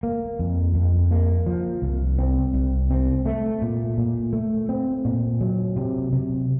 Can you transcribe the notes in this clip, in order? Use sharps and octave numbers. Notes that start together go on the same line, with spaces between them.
A#3
F2
F2
A#3
F3
C2
C4
C2
C4
A3
A#2
A#2
A3
C4
A#2
F#3
C3
C3